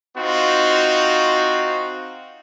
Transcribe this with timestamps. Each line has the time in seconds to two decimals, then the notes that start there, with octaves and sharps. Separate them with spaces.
0.16 C4 D#4 F4 F#4